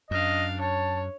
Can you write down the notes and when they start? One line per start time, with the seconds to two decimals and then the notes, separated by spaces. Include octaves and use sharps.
0.11 F#2 D4 D#5 F5
0.61 C#5 A5